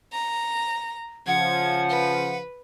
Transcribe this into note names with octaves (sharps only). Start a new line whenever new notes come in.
A#5
C#3 F3 F#5 G#6
B4